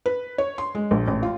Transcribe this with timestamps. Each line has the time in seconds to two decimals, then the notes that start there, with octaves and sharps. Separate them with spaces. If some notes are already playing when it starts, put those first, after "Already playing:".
0.06 B4
0.38 C#5
0.58 C6
0.75 G#3
0.91 A#1
1.08 A1
1.23 F4